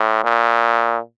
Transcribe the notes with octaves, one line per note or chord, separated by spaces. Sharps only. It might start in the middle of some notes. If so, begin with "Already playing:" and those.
Already playing: A2
A#2